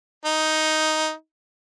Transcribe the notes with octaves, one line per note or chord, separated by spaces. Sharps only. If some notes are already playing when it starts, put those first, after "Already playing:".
D#4